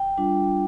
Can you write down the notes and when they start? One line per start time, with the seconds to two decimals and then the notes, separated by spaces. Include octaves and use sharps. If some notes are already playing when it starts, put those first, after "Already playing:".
Already playing: G5
0.18 G3 D4 F4